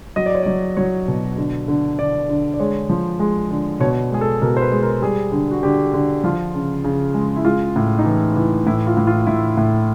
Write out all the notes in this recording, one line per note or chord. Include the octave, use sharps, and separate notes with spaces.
F#3 D#5
D5
C#5
F#3 D5
F#3 C#5
B2
D3
D3
D3 D5
D3
D5
G#3 C#5
F3
G#3
D3
B2 C#5
G#3 G#4
A4
B2 A#4
C5
B4
G#3
A#4
G3 G#4
D3
F#4
D3 G4
D3
F3 F4
C#3
C#3
G#3
E4
G#3 F4
A2
D#4
E3 E4
E3
A2 E4
F4
A2
F4
A2 E4
A2